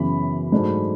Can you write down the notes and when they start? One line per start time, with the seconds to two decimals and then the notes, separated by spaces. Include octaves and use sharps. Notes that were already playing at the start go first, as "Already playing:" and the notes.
Already playing: F#2 C#3 E3 B3 B5
0.52 G#2 F#3 A3 D4